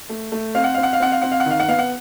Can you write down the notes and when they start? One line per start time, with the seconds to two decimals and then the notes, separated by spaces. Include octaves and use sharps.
0.09 A3
0.32 A3
0.55 C4 F5
0.64 F#5
0.74 C4 F5
0.83 F#5
0.93 F5
1.00 C4 F#5
1.12 F5
1.22 C4 F#5
1.32 F5
1.40 F#5
1.46 D#3 F5
1.60 F#5
1.68 B3 F5
1.79 F#5